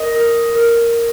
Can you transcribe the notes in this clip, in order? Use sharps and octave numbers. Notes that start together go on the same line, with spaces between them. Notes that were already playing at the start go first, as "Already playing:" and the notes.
Already playing: A#4 D#5
A#4
A#4